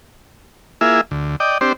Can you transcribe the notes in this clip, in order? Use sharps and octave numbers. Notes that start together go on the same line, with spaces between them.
A#3 E4 F4 G#4 E5
D2
D5 D#5 G5
C4 D4 G4 C5